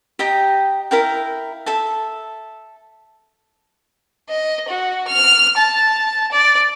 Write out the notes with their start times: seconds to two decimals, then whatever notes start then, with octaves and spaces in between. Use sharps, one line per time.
0.19 G4 D#5 G5 A#5
0.91 E4 A#4 F5 G5
1.66 A4 E5 A5
4.29 D#5
4.69 F#4
5.07 F6
5.57 A5
6.32 D5